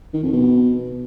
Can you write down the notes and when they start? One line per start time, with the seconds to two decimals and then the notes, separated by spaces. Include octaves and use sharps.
0.13 D#3
0.23 F2
0.32 B2